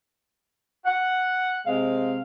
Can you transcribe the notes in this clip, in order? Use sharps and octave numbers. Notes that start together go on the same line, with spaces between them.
F#5
C3 G#3 C4 F5